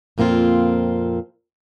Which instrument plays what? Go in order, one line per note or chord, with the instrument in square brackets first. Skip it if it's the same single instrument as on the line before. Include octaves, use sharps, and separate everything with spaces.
[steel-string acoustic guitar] F2 A#2 A#3 C4 F4